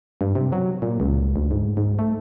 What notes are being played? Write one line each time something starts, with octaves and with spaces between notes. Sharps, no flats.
G2
C3
F#3
A#2
C#2
D2
G#2
G#2
A3